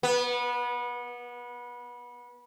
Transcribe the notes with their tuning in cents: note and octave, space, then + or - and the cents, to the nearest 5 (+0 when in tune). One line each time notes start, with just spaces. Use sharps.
B3 -25